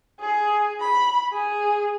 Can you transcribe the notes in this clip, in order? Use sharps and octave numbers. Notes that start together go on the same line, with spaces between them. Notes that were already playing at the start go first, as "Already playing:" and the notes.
G#4
B5
G#4